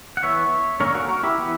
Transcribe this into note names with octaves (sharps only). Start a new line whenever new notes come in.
F#5
E3 B3 C#5 E5
D3 A#3 C#4 A#4 C#5
F#4 A#4
F#4 A#4
E4 G4
E3 B3